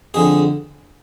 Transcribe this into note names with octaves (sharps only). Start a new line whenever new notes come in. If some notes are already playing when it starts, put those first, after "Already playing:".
F2 D3 G#4